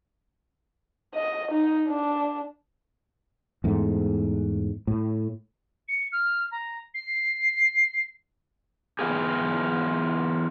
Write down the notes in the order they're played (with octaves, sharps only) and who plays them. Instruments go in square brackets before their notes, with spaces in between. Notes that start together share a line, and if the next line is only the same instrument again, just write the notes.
[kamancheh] D#5
D#4
D4
[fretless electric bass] E2 G#2 A3
A2
[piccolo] C#7
F6
A#5
C7
[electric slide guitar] E3 G3 B3 F4 G4 G#4